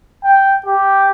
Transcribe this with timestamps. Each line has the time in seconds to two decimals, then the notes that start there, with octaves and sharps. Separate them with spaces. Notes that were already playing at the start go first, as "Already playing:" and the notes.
0.24 G5
0.66 G4